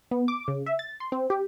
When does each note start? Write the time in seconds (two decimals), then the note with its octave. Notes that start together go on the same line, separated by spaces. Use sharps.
0.11 B3
0.28 D6
0.48 C#3
0.66 E5
0.79 A6
1.00 C6
1.12 C4
1.30 G4